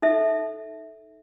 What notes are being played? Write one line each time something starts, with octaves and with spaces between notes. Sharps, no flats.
D#4 A4 E5